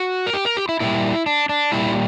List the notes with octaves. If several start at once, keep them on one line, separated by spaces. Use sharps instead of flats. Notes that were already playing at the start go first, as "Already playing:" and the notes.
Already playing: F#4
A#4
G4
A#4
G4
E4
A#2 G3 E4
D4
D4
A#2 G3 E4